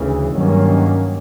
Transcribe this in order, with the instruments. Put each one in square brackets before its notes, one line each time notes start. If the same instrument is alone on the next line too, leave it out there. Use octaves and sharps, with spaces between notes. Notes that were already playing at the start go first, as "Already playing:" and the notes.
Already playing: [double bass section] D2 C#3 E3
G2 D#3 F#3 A#3 C#4